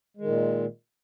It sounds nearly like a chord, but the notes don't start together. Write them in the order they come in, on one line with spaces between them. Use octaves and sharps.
G#3 D#3 A#2